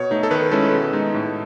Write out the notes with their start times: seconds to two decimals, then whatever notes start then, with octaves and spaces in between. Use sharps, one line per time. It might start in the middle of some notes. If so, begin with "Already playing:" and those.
Already playing: B2 C#5
0.11 A3 D#4
0.23 A4
0.31 D#3 B4
0.51 G#3 C#4 E4 A4
0.72 B2
0.93 G#3 D#4
1.14 A2